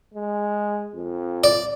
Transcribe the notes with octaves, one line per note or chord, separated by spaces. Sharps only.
G#3
F2
D5